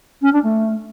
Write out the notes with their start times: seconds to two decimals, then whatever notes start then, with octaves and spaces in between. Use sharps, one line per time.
0.21 C#4
0.32 D4
0.43 A3